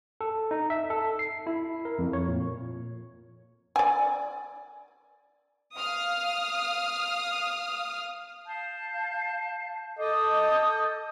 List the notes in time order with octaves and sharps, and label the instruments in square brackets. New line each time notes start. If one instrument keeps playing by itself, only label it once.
[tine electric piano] A4
D#4
E5
A4
C7
E4
A#4
F2
C#5
A#2
[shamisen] D5 G#5
[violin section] F5 D#6 F6
[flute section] F5 A5 G6
[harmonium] A4 D#5 [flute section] D6 D#6 G6